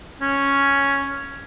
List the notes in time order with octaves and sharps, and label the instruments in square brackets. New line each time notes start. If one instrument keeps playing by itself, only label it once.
[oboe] C#4